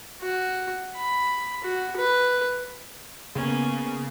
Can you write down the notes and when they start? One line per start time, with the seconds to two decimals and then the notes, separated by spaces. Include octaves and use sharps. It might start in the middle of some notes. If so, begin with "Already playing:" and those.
0.21 F#4
0.97 B5
1.64 F#4
1.97 B4
3.35 C#3 A#3 B3 C#4